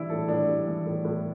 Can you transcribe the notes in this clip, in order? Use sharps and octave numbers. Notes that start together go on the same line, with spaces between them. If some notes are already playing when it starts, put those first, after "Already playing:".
Already playing: E3 G3 D4 E4
A2 A4
A2 D4
G3
E3
A2
A2